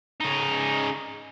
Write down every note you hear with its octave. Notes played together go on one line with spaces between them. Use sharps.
C#3 D#4